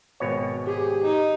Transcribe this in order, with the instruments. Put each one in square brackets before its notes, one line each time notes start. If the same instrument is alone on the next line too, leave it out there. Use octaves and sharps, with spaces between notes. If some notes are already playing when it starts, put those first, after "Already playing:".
[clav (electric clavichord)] G#1 B2 C#5
[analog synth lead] G4 [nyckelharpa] G#4
[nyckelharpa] D#4